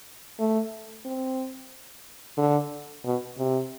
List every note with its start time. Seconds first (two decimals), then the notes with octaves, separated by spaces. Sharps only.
0.39 A3
1.05 C4
2.38 D3
3.05 B2
3.38 C3